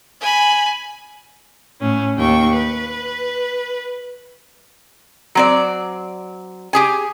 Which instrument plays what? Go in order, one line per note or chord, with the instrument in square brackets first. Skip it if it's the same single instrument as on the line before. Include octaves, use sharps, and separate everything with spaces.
[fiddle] G#5 B5
[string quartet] A2 C#4
D#2 G5 C#6
B4
[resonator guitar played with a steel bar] F#3 C4 D5
G4 G#4 G#5